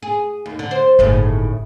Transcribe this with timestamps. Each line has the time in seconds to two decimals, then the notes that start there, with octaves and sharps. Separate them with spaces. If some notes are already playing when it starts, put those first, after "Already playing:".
0.03 G#4
0.46 D#2
0.59 D3
0.71 C5
0.99 G1 D#2 A2 C#3